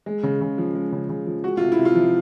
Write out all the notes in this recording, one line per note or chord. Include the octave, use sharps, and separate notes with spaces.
G#3
C#3
C#3
F3
G#3
C#3
C#3
F3
G#3 F#4
C3 F4
E4
C3
F4
F3